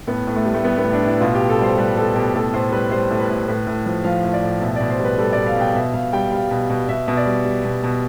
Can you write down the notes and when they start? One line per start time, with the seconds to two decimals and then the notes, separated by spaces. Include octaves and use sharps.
0.07 A2 B3
0.27 A2
0.36 A3
0.45 G3
0.54 A3
0.64 G3 B3
0.78 B3
0.84 A2
0.93 D4
1.02 A2 E4
1.21 B2 F4
1.35 G4
1.40 B2
1.49 A4
1.59 G3 C5
1.77 G3 B4
1.97 B2 A4
2.15 B2 G4
2.34 A2 A4
2.53 A2 C5
2.72 G3 B4
2.91 G3 C5
3.10 A2
3.20 B4
3.29 A2
3.48 A2 B4
3.67 A2
3.86 F3
4.04 F3 F5
4.24 A2
4.33 D5
4.43 A2
4.61 B2 E5
4.76 B2 D5
4.90 C5
4.99 G3
5.05 B4
5.18 G3 A4
5.32 B2 D5
5.47 F5
5.56 B2 G5
5.75 B2 E5
5.94 B2 F5
6.13 G3 G5
6.32 G3 F5
6.51 B2
6.70 B2
6.89 B2 E5
7.08 B2
7.17 D5
7.26 G3
7.45 G3
7.65 B2
7.83 B2